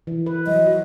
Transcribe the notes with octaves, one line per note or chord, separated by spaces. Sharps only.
E3
B4
F#3 D#5
F#4